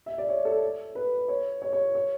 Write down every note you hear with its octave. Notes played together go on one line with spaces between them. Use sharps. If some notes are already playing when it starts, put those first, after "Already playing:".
E5
D5
C#5
A4
B4
C#5
C#5
C#5
C#5